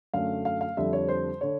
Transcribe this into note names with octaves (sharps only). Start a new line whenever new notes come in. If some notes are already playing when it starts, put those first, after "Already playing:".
F#2 D3 F#3 A3 F5
F5
F5
F2 D3 G3 E5
C#5
C5
D3 C#5